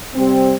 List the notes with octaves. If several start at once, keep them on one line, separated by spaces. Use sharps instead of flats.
C3 G3 C4